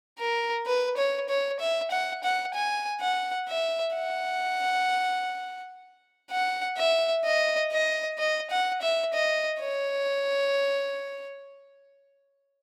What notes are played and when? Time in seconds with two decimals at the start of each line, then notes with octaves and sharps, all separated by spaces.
0.19 A#4
0.66 B4
0.97 C#5
1.29 C#5
1.60 E5
1.91 F#5
2.24 F#5
2.55 G#5
3.01 F#5
3.48 E5
3.96 F#5
6.31 F#5
6.77 E5
7.25 D#5
7.72 D#5
8.18 D#5
8.50 F#5
8.82 E5
9.13 D#5
9.60 C#5